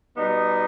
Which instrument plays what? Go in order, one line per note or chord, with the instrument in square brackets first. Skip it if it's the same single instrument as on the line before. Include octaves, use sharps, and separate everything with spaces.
[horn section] B2 G3 B3 D#4